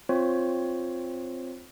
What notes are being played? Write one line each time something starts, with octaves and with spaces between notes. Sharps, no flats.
C4 F4 C5 C#5